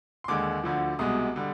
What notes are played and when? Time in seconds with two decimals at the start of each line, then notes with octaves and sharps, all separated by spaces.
0.24 C6
0.28 D#2 D3 G#3 D6
0.64 D2 D3 F3
0.99 C2 B2 G#3 D#6
1.36 D3 G3